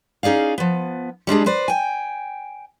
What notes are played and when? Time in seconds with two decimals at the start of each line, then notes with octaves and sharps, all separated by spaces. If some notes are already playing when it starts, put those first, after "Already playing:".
0.23 C#4 D#4 G#4 D5 F5
0.58 F3 B3
1.27 G3 G#3 D4 G#4
1.46 B4 C5 D5
1.68 G5 G#5